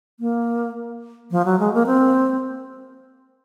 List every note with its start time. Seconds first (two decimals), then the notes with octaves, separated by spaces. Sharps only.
0.20 A#3
1.31 F3
1.45 F#3
1.59 G#3
1.74 A#3
1.86 C4